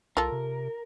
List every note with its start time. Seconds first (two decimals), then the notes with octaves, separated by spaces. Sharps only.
0.17 C2 F4 A4 A#4
0.32 C3